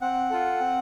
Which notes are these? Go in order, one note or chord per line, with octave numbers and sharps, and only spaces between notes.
C4 F#5
F4 A4
C4